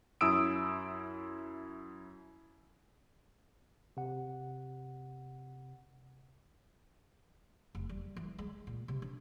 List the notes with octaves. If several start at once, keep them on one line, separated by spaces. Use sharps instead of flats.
F#2 E4 D#6 E6 D7
C3 F#5
F1
G3
E3
G#3
A#2
C3
D4